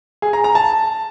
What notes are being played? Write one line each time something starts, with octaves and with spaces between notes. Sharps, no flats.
G#4
A#5
A#5
A5